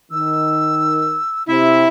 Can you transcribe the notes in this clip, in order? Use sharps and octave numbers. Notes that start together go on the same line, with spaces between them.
D#3 E6
C3 E4 E5